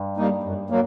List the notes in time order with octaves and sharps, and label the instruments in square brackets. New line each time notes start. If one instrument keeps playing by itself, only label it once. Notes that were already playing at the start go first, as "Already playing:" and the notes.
Already playing: [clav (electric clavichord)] G2
[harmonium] G3 A#3 D#4
F#2
F#3 A#3